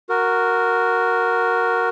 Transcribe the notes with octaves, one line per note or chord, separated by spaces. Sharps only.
F#4 A#4